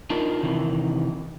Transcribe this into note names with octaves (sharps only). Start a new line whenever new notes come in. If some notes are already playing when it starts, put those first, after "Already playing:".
D4 D#4 F4 A#4
C3 D#3 E3